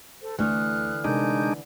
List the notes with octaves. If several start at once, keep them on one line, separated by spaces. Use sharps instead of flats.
A4 C5
D2 D3 E3 A3 D#6 F6 F#6
C3 G#3 D4 D#4 A#4 G6